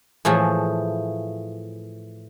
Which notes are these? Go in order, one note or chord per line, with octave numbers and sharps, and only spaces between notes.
A2 E3 F3 A3 G#4